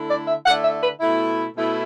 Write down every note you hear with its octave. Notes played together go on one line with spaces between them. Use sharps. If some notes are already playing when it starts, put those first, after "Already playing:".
Already playing: D3 A3 E4
D5
E5
D3 A3 E4 F#5
E5
B4
B2 A3 E4
B2 A3 E4